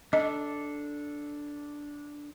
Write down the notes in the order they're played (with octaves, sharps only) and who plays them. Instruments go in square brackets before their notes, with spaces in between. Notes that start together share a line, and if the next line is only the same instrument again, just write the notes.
[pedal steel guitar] D4 A4 [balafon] D#5